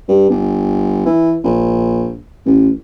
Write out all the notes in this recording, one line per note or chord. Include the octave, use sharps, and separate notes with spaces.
G2
G1
E3
A#1
A1